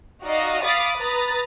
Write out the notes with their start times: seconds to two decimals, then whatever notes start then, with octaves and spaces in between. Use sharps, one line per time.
0.22 D#4 F#4 D5 D#5 F5
0.64 F5 B5 D6 D#6 A6
0.98 B4 A#5 B5 D#6 A6